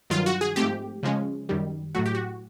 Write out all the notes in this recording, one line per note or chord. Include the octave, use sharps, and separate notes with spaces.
G2 D#3 F#3 F4
F#4
G#4
G#2 F3 A3 C4 G4
C#3 F3 G#3 C#4
F#2 D#3 G3
A2 F#3 A3 F#4
G4
F#4